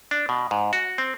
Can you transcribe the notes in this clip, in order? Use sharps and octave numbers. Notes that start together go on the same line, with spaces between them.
D4
B2
G#2
F#4
C4